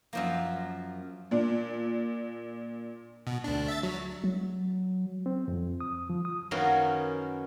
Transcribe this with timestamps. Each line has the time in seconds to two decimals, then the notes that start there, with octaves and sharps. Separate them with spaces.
0.13 F#2 F3 A#3
1.31 A#2 D4
3.27 B2
3.44 D2 D4
3.68 E5 A6
3.83 F#3
4.24 F#3
5.26 C4
5.48 F2
5.81 D#6
6.10 F3
6.25 D#6
6.51 F#2 D#3 F#3 A#3 B3 C#4